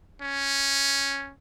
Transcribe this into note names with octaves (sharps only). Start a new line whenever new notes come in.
C#4